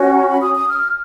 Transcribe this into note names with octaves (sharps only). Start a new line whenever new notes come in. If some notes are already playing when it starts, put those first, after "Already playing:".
Already playing: C#4 F#4 C#5
A#5
B5
D#6
D#6
F6